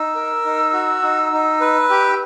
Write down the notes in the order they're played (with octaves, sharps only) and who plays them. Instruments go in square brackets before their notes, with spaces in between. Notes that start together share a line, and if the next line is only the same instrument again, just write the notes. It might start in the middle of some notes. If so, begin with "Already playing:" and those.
Already playing: [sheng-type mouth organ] D#4 [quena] E6
[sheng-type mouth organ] A#4
D#4
F#4
D#4
D#4
B4
G4